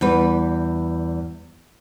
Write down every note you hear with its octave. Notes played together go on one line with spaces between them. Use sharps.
E2 G3 B4